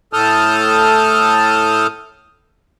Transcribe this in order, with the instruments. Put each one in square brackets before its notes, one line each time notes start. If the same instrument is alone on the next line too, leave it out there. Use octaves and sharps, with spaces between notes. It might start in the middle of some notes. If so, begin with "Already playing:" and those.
[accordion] A2 A4 A5 D#6 F6 G6